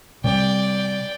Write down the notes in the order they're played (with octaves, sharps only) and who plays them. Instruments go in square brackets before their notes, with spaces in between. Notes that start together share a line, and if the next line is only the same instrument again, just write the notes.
[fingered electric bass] C3 G3 [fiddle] D5 G5